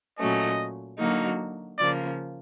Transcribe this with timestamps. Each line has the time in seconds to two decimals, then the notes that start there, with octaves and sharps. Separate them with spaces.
0.19 A#2 F#3 A3 C#4 D#5
0.98 D3 F#3 A#3 D#4 F#4
1.78 C#3 F3 A#3 D5